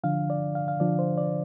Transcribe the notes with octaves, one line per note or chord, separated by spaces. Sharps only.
D3 F3 D4 F5
D5
F5
F5
D3 F3 D4 D5
C5
D5